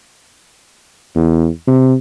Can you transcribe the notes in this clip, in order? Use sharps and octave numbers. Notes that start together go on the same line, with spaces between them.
E2
C3